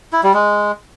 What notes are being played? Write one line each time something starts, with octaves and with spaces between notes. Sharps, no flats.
E4
G3
G#3